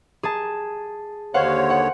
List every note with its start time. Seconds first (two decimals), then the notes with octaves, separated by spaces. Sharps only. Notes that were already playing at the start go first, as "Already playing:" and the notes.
0.23 G#4 A5
1.34 D#2 D3 C5 C#5 F5 F#5
1.70 F#5